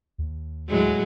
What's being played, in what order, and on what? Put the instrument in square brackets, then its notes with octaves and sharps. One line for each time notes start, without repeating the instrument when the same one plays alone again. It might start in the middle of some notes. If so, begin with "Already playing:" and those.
[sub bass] D#2
[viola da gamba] A2 F#3 G#3